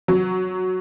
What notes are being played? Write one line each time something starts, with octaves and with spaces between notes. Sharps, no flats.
F#3